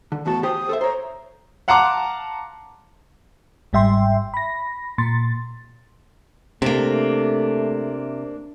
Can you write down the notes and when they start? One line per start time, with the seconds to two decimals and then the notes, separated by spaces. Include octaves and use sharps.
0.12 D3
0.26 E2 A2 F#4 A5
0.43 G4 C5 G5 D#6
0.69 A4 C5 E5
0.81 C5 C#5 A#5
1.68 F5 F#5 A5 A#5 C6 D6
3.73 G1 G#2 G3 E5 G5 C6
4.34 B5 A#6
4.98 A#2 C6 A6
6.62 C3 A3 A#3 D4